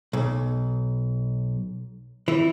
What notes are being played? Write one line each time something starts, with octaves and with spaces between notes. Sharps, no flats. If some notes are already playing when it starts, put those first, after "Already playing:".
B1
E3